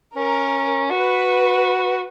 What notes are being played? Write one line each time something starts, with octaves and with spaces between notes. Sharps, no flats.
C#4 A#4
F#4 B4